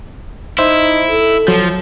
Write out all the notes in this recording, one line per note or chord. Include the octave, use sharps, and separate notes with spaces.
D#4 E4 C5 E5
A4
F3 F#3